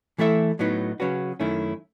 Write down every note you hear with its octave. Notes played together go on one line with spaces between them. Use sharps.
E3 A3 E4 A4 E5
A2 F#3 B3 D#4
C#3 F#3 C#4 F#4 B4
F#2 D#3 A3 C#4 E4